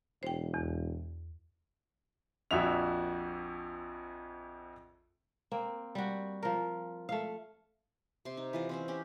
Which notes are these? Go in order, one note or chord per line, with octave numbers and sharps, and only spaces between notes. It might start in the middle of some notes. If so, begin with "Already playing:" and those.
E1 C5 G5
E2
A#1 F2 F#4 E5 F7
A#3 C4
G3 F#4
F3 A#4
A3 F5
C3 C6
D#4
E3 F4 D#5
C4 C#4 C5
C#4 G4